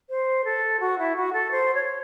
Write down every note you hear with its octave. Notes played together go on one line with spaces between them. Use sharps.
C5
A4
F#4
E4
F#4
A4
C5
C#5